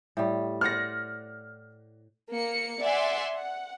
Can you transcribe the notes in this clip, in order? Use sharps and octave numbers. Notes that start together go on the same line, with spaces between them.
A2 G3
C5 D5 F#5 F6 A#6
A#3 C#7
D5 E5 F#5 G#5 C6
F#5